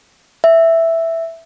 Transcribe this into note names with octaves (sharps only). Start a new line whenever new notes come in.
E5